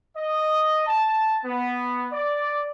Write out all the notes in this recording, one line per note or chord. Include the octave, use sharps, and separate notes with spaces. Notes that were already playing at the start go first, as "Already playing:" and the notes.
D#5
A5
B3
D5